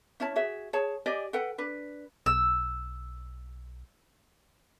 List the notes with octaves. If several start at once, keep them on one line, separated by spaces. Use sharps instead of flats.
C#4 E4 C#5 A5
F#4 G#4 E5
G#4 C#5 A5
G4 D5 D#5 G#5
A4 B4 F#5 G5
D4 B4
B1 E6